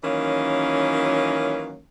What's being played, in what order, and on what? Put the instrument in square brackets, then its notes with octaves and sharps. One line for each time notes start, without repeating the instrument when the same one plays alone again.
[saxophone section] D#3 E3 F#3 A#3 C#4